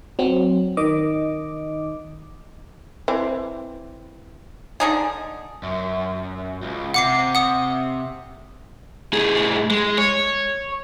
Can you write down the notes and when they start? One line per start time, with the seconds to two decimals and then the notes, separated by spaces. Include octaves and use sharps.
0.19 F#3 C4
0.77 D#3 D#5 D6
3.08 E3 C4
4.80 D3 D#4 G#4
5.63 F#2
6.62 C#2
6.94 C3 F#5 D6 C7
7.35 F#5 D#6
9.13 A2 G#4
9.71 G#3
9.98 C#5